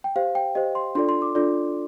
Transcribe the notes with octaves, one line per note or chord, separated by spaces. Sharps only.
G5
G4 C5 F5
G5
G4 C5 D#5
C6
D4 F4 A4 D5 C6
C6
D6
D4 F4 A4 D5